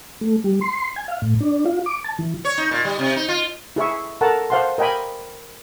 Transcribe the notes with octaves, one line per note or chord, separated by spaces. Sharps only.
A3
G3
C6
G#5
F5
A2
D4
F4
D6
A5
E3
C#5
D#4
A#2
G3
C3
D#4
F4
E4 G#4 E5 C#6
A4 A#4 F#5 A5
C5 F5 F#5 A5 C6
A#4 D#5 G5 G#5 B5